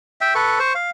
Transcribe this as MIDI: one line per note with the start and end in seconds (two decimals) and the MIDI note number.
0.21 0.34 76
0.21 0.34 79
0.35 0.59 69
0.35 0.59 71
0.35 0.59 85
0.59 0.74 72
0.59 0.74 85
0.75 0.90 77